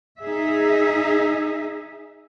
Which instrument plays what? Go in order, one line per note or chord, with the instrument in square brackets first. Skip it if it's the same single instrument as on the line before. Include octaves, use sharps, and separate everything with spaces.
[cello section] D#4 G#4 E5